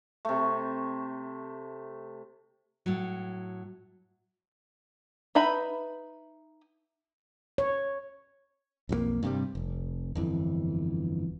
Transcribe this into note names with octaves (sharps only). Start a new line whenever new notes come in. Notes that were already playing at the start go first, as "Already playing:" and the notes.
C3 A3
A2 F#3
D#4 B4 E5 B5
C#5
B1 F2 F#3 A#3
G2 C3 G3
F1
G1 F2 E3